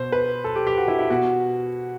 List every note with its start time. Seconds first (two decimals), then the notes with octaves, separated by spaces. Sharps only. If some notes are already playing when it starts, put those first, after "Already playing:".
Already playing: B2 C5
0.12 B4
0.44 A4
0.56 G4
0.67 G4
0.78 F#4
0.88 E4
0.99 E4
1.10 B2 F#4